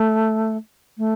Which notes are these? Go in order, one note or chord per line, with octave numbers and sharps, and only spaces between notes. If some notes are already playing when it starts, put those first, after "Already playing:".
Already playing: A3
A3